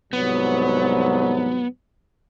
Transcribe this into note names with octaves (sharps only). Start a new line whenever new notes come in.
C2 G#2 F#3 B3